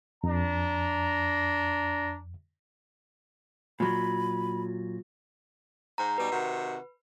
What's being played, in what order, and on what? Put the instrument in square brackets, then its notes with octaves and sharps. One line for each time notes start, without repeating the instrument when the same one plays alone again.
[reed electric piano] F2 [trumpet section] D4 A#5
[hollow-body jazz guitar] A#2 F#3 [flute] B5
[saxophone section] G#2 C5 [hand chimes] A#5
[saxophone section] B2 G3 D#4 [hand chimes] B4
[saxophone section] C3 D#3 F#4